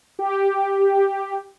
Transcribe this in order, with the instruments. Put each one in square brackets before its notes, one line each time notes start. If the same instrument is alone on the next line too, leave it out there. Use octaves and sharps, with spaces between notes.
[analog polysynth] G4